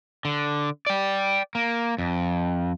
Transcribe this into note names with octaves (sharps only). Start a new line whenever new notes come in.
D3
D5 G5
A#3
F2